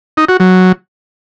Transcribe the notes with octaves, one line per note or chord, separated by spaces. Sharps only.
D#4
F#4
F#3